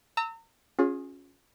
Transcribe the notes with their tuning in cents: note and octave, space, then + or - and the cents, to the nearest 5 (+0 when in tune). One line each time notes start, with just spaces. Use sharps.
A#5 -40 E6 -20
C#4 +0 F4 +35 G#4 +0